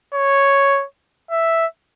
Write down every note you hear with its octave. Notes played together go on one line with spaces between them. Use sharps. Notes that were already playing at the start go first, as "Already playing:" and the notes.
C#5
E5